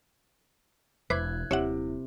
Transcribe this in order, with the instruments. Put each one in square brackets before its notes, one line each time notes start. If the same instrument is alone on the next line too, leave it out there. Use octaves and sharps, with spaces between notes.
[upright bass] E1 [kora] E4 [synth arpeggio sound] B4 C5 D6 [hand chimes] F#6 G#6
[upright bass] D#1 [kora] C3 [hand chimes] E4 [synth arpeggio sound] C#5 E5 F#5